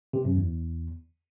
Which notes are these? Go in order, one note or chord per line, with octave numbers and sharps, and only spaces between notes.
C3
F#2
E2